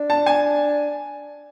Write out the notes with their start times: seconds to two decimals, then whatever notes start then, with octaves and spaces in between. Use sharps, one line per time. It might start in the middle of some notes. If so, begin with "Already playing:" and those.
Already playing: D4
0.10 A5
0.26 G#5